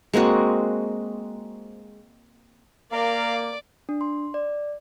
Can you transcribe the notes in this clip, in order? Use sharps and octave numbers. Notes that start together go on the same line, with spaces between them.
G#3 A#3 C4 F#4
A#3 A#4 D5 F5 D6
D4
C6
D5